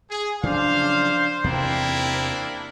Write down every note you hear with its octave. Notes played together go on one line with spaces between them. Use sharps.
G#4 G#5
C#3 F3 F#3 D4 C5 F5
E2 C3 A#3 C4 D4 E4